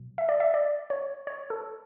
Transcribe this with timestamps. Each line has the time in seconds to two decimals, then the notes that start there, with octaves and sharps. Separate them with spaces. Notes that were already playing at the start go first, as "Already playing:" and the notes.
Already playing: B2 F#3
0.18 E5
0.29 D5
0.40 E5
0.54 D5
0.90 C#5
1.27 C#5
1.50 A4